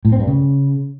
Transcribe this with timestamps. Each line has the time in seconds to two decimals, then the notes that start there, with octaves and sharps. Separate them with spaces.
0.05 A2
0.12 C4
0.20 G2
0.27 C#3